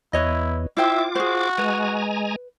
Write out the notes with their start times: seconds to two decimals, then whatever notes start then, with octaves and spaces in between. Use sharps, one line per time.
0.13 E2 E4 B4 C#5 D#5
0.77 E4 F4 C5 E5 G5 D6
1.15 F#4 G#4 C5
1.58 G#3 B4 G#5 A#5